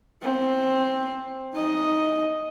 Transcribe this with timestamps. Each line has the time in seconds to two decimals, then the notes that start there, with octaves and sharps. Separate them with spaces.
0.22 C4
1.54 D#4 D#5